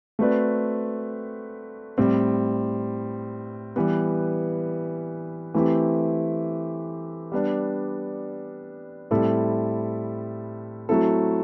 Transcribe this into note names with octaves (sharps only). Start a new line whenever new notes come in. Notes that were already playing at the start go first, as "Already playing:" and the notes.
A3 C4 F#4 B4 D5
A2 G3 C4
E3 G3 B3
E3 A3 C4 E4 G4
G3 B3 D4
A2 G3 C4 E4 A4
F#3 A3 C4 E4 A4